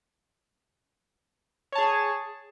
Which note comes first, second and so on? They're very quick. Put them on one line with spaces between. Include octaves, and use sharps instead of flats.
C#5 A5 G#4